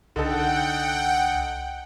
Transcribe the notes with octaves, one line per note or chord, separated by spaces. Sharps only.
C2 D3 D#4 A4 F#5 G5